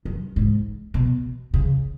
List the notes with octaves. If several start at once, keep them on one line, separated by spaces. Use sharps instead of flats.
F#2
G#2
B2
C#3